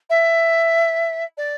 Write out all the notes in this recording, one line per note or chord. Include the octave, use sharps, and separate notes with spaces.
E5
D5